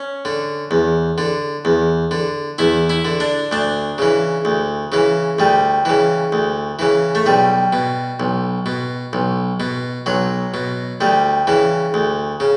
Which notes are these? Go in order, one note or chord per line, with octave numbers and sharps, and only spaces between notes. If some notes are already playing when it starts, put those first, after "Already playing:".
Already playing: C#4
D3
E2
D3
E2
D3
E2 E4
E4
D3
D4
D2 D4
C#3 E3
D2
C#3 E3
D2 G3
C#3 E3
D2
C#3 E3
A3
B1 G3
B2
B1
B2
B1
B2
B1 F#3
B2
D2 G3
C#3 E3
D2
C#3